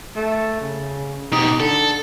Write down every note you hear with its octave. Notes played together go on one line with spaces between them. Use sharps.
A3
C#3
B2 D#4 G4
D3 A4